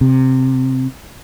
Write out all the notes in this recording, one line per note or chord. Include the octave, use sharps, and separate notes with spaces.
C3